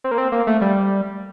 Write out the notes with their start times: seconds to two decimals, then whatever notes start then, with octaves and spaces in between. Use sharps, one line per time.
0.04 C4
0.11 A#3
0.18 C4
0.32 A#3
0.47 A3
0.61 G3